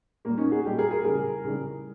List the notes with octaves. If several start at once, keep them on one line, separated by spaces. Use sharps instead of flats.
A#2 G3 A#3
C#4 D#4
F#4 G#4
A#2 G3 G4 A4
G#4 A#4
G#4 A#4
C#3 E3 G3 G#4 A#4
C#3 E3 G3